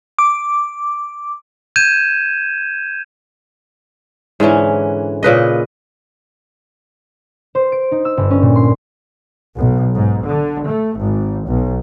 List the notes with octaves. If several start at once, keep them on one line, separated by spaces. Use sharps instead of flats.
D6
G6 G#6 D#7 E7
G#2 D3 E3 C#4
A#2 C#3 B4 D#5
C5
D7
D#4
E6
G1
C#4
A#2
C6
B1
G#2
D3
A3
G#1
B1